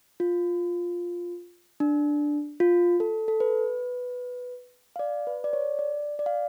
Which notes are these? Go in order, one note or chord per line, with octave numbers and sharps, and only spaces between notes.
F4
D4
F4
A4
A4
B4
F5
D5
B4
D5
C#5
D5
D5
F5